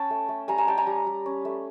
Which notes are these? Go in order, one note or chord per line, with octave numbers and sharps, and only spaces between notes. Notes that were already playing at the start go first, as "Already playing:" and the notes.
Already playing: C#4 G5 A5
A3
A3
G3 G#5 A#5
G#5 A#5
G3 G5 A5
G#5 A#5
G3
G3
C#4
A3